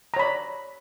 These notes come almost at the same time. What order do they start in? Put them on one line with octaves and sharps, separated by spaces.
A#5 C#5 B5 D5